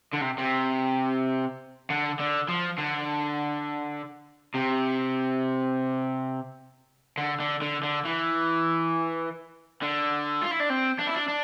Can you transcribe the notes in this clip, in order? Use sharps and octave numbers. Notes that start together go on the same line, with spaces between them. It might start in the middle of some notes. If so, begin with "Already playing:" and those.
D3
C3
C3
D3
D3
F3
D3
C3
D3
D3
D3
D3
E3
D3
F4
E4
D4
C4
D4
E4
D4
D4